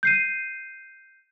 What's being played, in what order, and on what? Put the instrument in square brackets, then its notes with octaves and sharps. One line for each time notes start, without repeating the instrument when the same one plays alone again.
[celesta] G6 C7 D#7